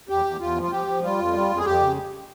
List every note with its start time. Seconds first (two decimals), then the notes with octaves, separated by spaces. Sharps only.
0.09 E2 G4
0.25 E2
0.40 E2 F4
0.56 F3
0.63 F4
0.71 F3 G4
0.87 F3
1.03 G3 F4
1.19 F2
1.34 G3
1.50 F2
1.57 G#4
1.65 F2 G4
1.81 C#3